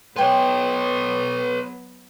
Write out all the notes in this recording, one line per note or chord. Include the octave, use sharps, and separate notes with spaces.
F#3 B3 B4 C#5 G5 G#5 C6